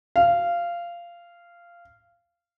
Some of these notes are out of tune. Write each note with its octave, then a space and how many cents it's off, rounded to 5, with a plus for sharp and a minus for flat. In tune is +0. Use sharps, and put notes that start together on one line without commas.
F5 -15